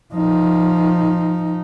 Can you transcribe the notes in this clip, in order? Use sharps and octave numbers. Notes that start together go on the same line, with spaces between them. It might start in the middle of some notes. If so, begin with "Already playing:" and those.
F3 D#4